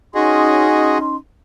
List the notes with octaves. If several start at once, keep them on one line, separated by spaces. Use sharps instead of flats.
C#4 D#4 F#4 G#4 D#5 C6